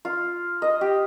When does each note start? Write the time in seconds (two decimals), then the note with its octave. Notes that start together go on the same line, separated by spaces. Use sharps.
0.05 F4
0.62 D#5
0.81 G4